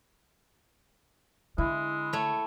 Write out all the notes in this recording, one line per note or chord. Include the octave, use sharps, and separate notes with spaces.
D3 G#3 E4
A3 C#5